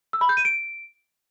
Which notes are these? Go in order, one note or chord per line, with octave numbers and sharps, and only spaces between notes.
E6
B5
G6
D#7
D7